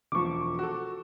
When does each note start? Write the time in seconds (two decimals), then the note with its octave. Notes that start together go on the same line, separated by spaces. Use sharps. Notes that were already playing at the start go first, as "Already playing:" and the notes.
0.12 E1 F3 C#6 D6
0.59 F#4 A4